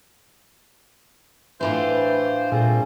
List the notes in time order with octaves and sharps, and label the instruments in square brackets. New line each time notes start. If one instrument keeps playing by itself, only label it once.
[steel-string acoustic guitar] A2 D4 F4 [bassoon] E3 [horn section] C5
[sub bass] A#2 [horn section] G3 A3 C4 [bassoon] G#4